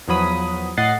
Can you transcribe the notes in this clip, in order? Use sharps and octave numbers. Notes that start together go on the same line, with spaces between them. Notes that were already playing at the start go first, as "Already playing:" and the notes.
E2 F3 F#3 B5 D#6
A2 D#5 F#5 A6 C7